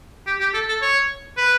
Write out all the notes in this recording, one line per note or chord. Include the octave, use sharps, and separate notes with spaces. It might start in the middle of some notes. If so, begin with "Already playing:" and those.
G4
G4
A4
A4
C#5
B4